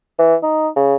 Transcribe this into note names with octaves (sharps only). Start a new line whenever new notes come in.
E3
D#4
C#3